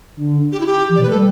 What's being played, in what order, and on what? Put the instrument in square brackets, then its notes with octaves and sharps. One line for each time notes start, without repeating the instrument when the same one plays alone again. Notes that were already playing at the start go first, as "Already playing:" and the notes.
[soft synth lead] D3
[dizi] G4
E4
G4
[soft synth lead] E3
[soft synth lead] B2 [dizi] D5
[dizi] B4
[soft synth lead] A3
[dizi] A4
[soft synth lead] G3